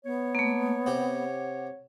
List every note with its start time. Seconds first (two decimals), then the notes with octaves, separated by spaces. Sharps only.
0.05 B3 C#5
0.35 A3 A#3
0.86 C3 G4 F#5